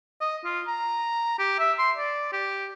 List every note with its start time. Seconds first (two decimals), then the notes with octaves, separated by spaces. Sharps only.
0.21 D#5
0.45 F4
0.67 A#5
1.39 G4
1.59 E5
1.79 C6
1.97 D5
2.33 G4